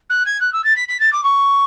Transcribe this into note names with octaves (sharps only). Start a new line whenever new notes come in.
F#6
G#6
F#6
E6
A6
B6
B6
A6
D6
C#6